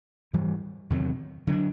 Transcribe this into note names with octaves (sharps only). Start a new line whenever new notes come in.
G#2 E3 G3
E2 C3 D#3 F#3
D3 F#3 B3 D4